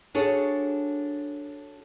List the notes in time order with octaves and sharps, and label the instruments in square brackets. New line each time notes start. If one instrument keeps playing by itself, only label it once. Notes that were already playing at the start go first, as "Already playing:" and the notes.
[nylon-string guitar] D4 F#4 G#4 A4 C#5